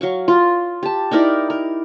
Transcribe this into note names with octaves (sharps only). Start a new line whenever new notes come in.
F#3 F5 C#6
F4
G4 A5
D#4 E4 A#4 D5
A#4